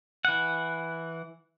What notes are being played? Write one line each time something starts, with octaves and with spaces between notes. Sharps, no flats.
E3 F#5